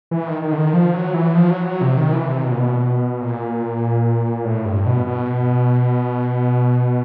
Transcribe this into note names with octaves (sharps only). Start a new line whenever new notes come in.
E3
D#3
D#3
D3
D#3
F3
F#3
E3
F3
F#3
F#3
C3
D#3
E3
C3
B2
A#2
B2
A#2
A2
G2
B2
B2